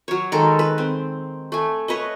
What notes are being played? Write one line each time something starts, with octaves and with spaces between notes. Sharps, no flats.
F#3 C#5
D#3 G#3 A4 A#4
B4
C4
A3 G#5
B4 C#5 D#5